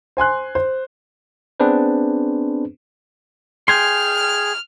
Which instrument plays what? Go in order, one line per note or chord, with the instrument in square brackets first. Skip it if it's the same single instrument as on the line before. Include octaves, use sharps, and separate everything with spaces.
[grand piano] C5 G#5 C6 F#6
C5
[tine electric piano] B3 C4 D4 G#4 B4 C5
[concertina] G#4 [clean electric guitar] G5 G#5 C6 [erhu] F6